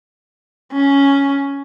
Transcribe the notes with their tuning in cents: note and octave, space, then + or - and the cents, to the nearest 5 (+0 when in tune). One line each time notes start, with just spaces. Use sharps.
C#4 +5